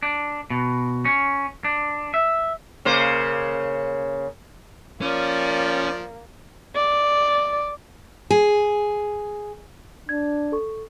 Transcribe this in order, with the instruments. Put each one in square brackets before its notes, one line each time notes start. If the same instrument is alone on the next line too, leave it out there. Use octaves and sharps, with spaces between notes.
[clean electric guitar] D4
B2
C#4
D4
E5
[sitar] C#3 A#3 C5
[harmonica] F3 D5 [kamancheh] A#3 [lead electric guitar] C#4
[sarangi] D5
[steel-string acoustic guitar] G#4
[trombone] D4 [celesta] G#6
[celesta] A4 C#6